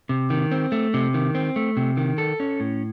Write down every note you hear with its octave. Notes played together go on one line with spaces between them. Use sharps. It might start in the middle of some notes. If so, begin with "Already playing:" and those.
C3
D#3
C4
A3
C3
D#3
C4
A3
C3
D#3
A4
C#4
A2